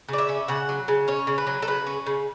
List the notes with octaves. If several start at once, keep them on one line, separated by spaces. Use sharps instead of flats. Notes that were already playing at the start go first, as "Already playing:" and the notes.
C#3 D5
E5
C#4
C#3 F#5
F#3
C#3
C#4 C#5
C#3
B4
F#3
A4
C#3 B4
C#4
C#3